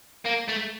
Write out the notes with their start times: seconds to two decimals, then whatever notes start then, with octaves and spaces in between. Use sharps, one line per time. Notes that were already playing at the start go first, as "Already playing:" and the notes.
0.25 A#3
0.48 A3